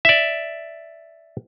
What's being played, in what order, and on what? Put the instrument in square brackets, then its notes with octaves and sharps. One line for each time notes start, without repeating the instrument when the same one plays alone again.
[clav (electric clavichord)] D5 E5